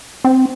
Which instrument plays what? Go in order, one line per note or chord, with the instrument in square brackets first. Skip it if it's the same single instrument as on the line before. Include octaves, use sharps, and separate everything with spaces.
[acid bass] C4